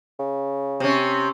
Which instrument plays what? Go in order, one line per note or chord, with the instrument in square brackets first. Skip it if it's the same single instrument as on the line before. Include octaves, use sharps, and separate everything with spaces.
[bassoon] C#3
[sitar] C3 C#4